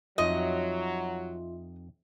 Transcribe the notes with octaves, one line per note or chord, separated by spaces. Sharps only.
F2 F#3 D#4 F4 D#5 E5